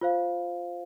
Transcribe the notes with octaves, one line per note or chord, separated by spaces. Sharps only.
F4 C5 F5